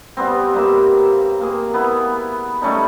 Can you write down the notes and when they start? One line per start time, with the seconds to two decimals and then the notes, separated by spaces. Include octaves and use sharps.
0.17 G2 B3 C4
0.54 G2 A#3 E5
1.41 A#3 G#4
1.74 B3 E4
2.62 G3 A3 C#4 D#4